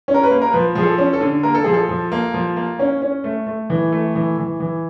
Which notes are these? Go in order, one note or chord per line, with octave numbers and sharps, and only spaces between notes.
C#4
A#4
B4
A#3
A#4
F3 B4
F3 G#4
A4
C#4
A4
D3
A#3 A#4
A4
F3 G#4
A4
F3
A#3
F3
A#3
C#4
C#4
A3
A3
E3
A3
E3
E3
E3